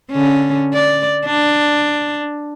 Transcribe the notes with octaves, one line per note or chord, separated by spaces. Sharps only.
D3 C#4
D5
D4